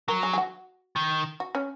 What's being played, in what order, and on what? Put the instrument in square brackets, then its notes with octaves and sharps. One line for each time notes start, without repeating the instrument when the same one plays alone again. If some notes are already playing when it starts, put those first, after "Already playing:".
[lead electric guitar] F#3 [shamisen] A#4
[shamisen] G#4
G#4
F#4
[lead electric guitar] D#3
[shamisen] F#4
C#4